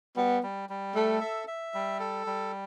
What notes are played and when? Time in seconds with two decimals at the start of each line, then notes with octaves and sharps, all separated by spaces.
0.16 G3 B3
0.43 G3
0.69 G3
0.95 A3 A4
1.21 E5
1.48 E5
1.74 G3
2.00 A4
2.26 G3